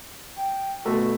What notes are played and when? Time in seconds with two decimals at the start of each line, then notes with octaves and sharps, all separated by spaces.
0.37 G5
0.86 B2 A3 F#4